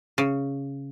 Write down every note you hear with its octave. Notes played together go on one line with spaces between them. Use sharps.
C#3